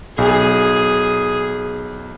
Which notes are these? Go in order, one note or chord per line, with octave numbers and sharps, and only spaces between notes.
B1 G#4